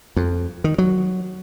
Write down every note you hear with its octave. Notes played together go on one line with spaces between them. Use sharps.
F2
D#3
F#3